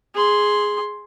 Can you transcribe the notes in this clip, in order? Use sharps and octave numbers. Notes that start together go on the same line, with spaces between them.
G#4 C6